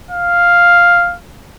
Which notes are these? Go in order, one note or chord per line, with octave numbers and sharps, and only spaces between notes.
F5